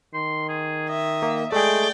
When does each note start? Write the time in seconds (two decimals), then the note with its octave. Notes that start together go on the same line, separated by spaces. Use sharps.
0.14 D#3 C6
0.49 G#4
0.89 D#5 E5
1.22 A#3
1.52 G#3 A3 G#4 D5 G5